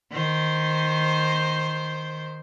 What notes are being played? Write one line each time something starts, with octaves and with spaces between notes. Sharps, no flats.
D#3 C5